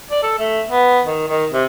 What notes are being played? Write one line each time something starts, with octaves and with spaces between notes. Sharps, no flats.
D5
A4
A3
B3
D#3
D#3
C3